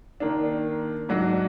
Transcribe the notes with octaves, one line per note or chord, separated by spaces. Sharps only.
D#3 A#3 D4
G#2 F#3 D4 F#4